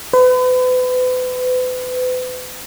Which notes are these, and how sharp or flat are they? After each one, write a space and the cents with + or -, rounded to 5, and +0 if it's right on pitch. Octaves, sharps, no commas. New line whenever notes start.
B4 +40